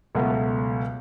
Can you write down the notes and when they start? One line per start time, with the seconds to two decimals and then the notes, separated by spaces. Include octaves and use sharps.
0.15 C#2 B2 F#3 A3